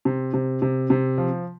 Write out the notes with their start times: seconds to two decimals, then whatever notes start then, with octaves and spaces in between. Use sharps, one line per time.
0.05 C3
0.34 C3
0.62 C3
0.90 C3
1.18 F3